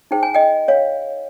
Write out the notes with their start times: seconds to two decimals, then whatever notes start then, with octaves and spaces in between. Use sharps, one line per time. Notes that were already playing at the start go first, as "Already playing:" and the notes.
0.11 D#4 G#4 C5 G5
0.23 G#5
0.35 D#5 G5
0.68 C#5 F5